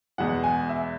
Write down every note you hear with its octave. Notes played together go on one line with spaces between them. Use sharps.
E2 B2 G#3 F#5
G#5
E5